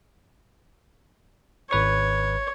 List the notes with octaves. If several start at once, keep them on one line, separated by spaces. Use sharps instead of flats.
G#1 B4 C#5 C#6